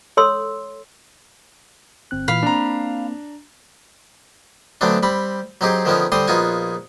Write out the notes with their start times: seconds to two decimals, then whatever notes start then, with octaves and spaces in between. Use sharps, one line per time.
0.17 A4 C#5 C6 E6
2.11 G1 C4 F#6
2.28 A#2 E3 F5 B5
2.43 A#3 C4 D4 A#5
4.81 D3 F#3 A3 B3 C4 D4
5.03 G3 C4 B5
5.61 F#3 C4 D#4 G4 G#4
5.85 D3 D#3 F3 B3 C#4 D#4
6.12 D3 G3 C4 C6 D#6
6.28 A#1 B3 D#4 F4 F#4 G#5